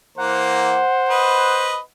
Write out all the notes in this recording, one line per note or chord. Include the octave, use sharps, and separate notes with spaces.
E3 A#3 C5 F#5 A#5
B4 D#5